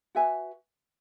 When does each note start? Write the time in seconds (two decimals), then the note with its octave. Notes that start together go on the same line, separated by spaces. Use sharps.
0.15 F#4 B4 E5 G#5